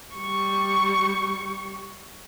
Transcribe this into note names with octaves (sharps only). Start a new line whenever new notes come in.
G3 C#6